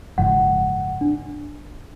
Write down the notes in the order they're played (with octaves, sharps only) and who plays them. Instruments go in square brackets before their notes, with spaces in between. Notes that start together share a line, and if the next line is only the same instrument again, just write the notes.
[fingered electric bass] F#1 G#2 F3 [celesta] F#5
[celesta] D4